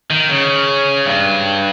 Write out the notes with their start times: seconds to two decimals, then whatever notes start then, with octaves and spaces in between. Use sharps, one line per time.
0.10 D#3
0.29 C#3
1.06 G2